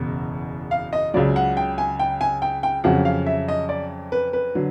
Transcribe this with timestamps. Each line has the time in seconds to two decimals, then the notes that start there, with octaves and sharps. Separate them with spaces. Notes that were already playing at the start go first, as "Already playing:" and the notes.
Already playing: F#1 E2 B2
0.71 F5
0.93 D#5
1.14 C#2 C#3 F#3 D5
1.36 F#5
1.57 G5
1.78 G#5
1.99 G5
2.21 G#5
2.42 G5
2.63 G5
2.84 F2 C#3 F#3 F#5
3.05 F5
3.26 E5
3.48 D#5
3.69 D5
4.12 B4
4.33 B4
4.55 D3 F#3